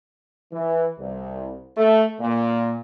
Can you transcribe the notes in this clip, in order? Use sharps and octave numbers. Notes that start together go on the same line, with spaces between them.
E3
C2
A3
A#2